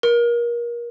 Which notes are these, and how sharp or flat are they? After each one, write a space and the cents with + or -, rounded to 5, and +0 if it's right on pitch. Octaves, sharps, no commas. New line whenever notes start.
A#4 +30